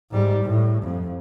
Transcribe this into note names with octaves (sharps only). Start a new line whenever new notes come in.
G#2 G3
A2
F2